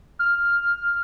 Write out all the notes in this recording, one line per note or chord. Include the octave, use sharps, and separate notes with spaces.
F6